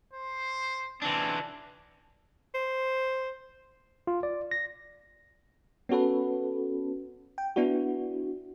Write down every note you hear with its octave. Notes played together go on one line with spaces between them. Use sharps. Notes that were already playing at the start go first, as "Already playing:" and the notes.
C5
E3 C4 D4
C5
F4
D5
A#6
B3 C#4 F#4 A4 B4
G5
B3 D4 E4 F#4